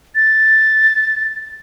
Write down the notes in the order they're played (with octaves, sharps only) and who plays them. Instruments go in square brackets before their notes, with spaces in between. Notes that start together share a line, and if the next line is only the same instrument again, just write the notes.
[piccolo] A6